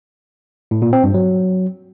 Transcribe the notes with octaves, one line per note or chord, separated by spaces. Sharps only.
A2
A#2
C4
G2
F#3